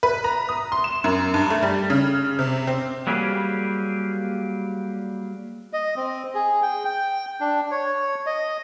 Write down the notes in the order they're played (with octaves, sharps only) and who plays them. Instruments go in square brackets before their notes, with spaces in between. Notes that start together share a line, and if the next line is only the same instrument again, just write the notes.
[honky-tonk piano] B4
A#5
D#6
C6
E7
F#2
G2
A3
G3
C#3
C3
C4
[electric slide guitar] F#3 G3 A#3 G4 G#4
[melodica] D#5
C4
G#4
G5
G5
D4
C#5
D#5